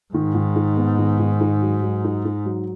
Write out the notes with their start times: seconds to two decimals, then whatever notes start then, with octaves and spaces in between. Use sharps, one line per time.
0.14 G#2 D#3
0.35 D#3
0.56 D#4
0.77 B3
0.99 D#3
1.20 D#3
1.41 D#4
1.62 F#3
1.82 F#3
2.04 D#4
2.25 D#4
2.45 F#3